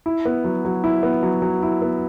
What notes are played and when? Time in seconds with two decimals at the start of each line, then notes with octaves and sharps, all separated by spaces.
0.06 E4
0.25 B3
0.44 F#3
0.65 F#3
0.84 E4
1.03 B3
1.23 F#3
1.42 F#3
1.63 E4
1.82 B3